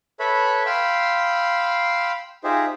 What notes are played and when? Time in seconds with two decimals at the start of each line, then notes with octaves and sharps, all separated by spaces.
0.19 A4 B4 C#5 E5 B5
0.66 F5 G5 B5 C6 E6
2.44 D#4 F4 G4 G#4 C5 E5